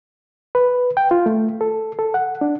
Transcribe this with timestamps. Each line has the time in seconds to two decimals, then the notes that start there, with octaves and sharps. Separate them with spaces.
0.55 B4
0.97 G5
1.11 F4
1.26 A3
1.61 A4
1.99 A4
2.14 F#5
2.41 D4